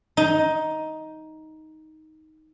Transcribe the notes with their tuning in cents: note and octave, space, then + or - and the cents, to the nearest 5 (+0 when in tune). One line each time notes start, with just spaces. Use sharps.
D#4 +10